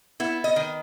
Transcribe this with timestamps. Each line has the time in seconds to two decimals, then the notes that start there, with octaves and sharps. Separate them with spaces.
0.20 B3 E4
0.44 D#5
0.56 D#3